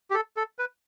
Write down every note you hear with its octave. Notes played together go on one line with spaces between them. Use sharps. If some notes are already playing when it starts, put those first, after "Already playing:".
G4
A4
A4
B4